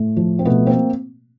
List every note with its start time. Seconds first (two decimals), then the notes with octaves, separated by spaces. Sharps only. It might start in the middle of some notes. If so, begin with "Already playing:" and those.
Already playing: A2 A3
0.17 F3
0.39 C4
0.45 B2 A3 B3
0.67 A#3 C4